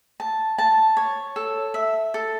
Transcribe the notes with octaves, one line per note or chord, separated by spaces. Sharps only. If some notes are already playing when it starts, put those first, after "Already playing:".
A5
A5
C#5
A4
E5
A4